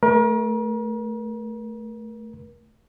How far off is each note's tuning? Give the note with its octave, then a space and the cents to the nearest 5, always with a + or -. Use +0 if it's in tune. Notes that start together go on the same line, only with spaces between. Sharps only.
A3 +0 A#4 +40